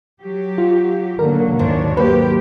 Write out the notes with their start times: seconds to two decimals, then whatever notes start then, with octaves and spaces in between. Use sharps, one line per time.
0.21 F#3 G4
0.58 F4
1.19 G#2 D3 F#3 A#3 A#4
1.59 D#2 G#2 D#3 F#3 D4 C#5
1.97 A#3 G4 A4 B4 C5